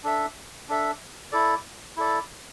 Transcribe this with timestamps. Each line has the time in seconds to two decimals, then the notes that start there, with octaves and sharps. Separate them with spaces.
0.03 D4 A4 E5
0.69 D4 A4 E5
1.32 E4 A4 D5
1.97 E4 A4 D5